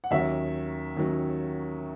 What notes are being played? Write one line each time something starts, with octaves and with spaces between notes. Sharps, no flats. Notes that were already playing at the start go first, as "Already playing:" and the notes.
F#5
D#2 D#3 F#3 C#4 E5
D#2 D#3 F#3 C#4